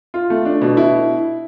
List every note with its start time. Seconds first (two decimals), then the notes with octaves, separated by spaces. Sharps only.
0.14 F4
0.30 A3
0.45 D4
0.61 B2
0.77 E4